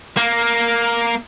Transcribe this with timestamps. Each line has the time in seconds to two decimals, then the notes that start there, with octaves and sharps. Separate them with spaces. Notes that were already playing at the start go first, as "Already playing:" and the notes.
0.17 A#3